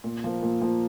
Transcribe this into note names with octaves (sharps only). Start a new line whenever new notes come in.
A#2
F3 A#3
A#2
F3 A#3